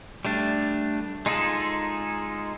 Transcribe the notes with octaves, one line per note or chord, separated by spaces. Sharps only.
G3 A3 D4
G#3 D#4 F4 G#4 A4